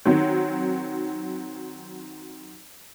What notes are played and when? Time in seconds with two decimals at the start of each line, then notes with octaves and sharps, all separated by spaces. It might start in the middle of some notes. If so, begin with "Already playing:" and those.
0.05 D#3 F#3 C4